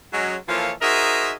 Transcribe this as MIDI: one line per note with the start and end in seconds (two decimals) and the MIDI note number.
0.13 0.36 54
0.13 0.36 56
0.13 0.36 61
0.49 0.72 52
0.49 0.72 53
0.49 0.72 58
0.49 0.72 65
0.49 0.72 69
0.49 0.72 73
0.82 1.34 63
0.82 1.34 66
0.82 1.34 68
0.82 1.34 70
0.82 1.34 72
0.82 1.34 76